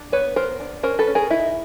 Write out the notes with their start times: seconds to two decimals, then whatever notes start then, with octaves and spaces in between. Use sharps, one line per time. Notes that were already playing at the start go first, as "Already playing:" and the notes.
Already playing: D4
0.12 B3 B4 C#5
0.36 B3 A#4 C5
0.60 D4
0.83 C#4 A#4 C5
0.99 A4 B4
1.07 C#4
1.15 G#4 A#4
1.30 D#4 E4